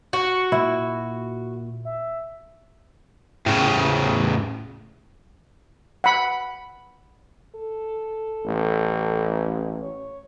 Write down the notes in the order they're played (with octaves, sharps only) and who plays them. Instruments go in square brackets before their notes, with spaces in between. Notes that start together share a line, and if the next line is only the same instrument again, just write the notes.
[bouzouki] F#4 [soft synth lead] C#7
[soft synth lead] A#2 [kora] E4
[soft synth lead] E5
[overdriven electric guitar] A2 C#3
[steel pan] F#5 B5
[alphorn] A4
[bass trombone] A1
[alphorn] C#5